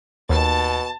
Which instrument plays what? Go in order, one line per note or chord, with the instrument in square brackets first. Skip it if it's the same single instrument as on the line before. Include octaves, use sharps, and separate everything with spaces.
[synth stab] D#2 [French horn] B2 [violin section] A5 A6